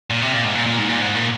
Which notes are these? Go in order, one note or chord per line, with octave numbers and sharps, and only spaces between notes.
A#2
C3
A#2
G#2
A#2
A#2
G#2
A#2
G#2
A#2